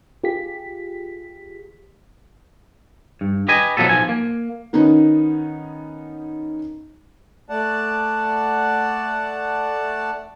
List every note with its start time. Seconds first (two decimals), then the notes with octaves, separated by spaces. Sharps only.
0.24 F4 G4 G#4 B6
3.21 G2
3.48 G4 B4 D#5 G#5
3.77 B2 F3 F#3 B3 A4
3.89 B1 F3 G#5
4.09 A#3
4.73 D#3 B3 C#4 D#4
7.49 A3 D5 F#5 A5